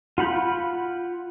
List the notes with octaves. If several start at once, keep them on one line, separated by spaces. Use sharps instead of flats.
F4 F#5 B5 G6